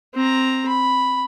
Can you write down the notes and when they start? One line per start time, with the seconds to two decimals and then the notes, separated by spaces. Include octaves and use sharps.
0.14 C4 A#5
0.68 B5